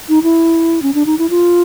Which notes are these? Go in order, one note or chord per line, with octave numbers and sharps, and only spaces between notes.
D#4
E4
C#4
D4
D#4
E4
F4